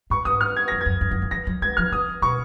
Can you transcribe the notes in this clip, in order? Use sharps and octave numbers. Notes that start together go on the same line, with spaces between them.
G#2 C#6
G#2 D#6
F6
G#6
F2 A#6
F#2 G#6
F#2
F#2
G#2
F3 A#6
F#3
G#3 G#6
F3 F6
C#3 D#6
B2 C#6